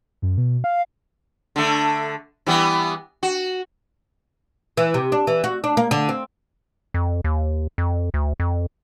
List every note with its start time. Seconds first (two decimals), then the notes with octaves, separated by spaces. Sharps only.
0.22 F#2
0.38 B2
0.64 F5
1.56 D3 A3
2.46 E3 G3 B3
3.23 F#4
4.77 E3
4.94 C3
5.12 D4
5.27 E3
5.44 F#4
5.64 D4
5.77 A#3
5.91 D3
6.09 C4
6.94 F2
7.24 D#2
7.78 F2
8.14 D2
8.40 F2